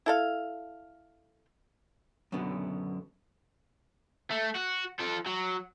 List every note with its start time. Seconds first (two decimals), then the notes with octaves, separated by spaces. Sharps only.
0.06 E4 A4 F5
2.32 F#2 B2 D3 B3
4.31 A3
4.56 F#4
5.00 F3 A4
5.26 F#3